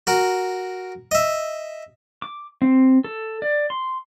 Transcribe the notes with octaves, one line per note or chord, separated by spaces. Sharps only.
F#4 A#4
D#5 E5
D6
C4
A4
D5
C6